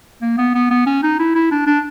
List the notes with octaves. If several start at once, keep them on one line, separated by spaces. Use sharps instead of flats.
A#3
B3
B3
B3
C#4
D#4
E4
E4
D4
D4